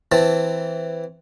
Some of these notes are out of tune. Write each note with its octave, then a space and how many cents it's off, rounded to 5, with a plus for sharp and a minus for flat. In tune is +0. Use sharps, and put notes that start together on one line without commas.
E3 +0 C4 +0 A5 +0